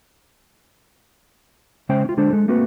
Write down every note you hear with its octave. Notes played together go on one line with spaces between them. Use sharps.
C#3 G#3 C#4 C5 E5 G5
C#4 F4
D3 G#3 D4 A4 C5
G#3 A4
A3 A#3 C4 F#4 A4 B4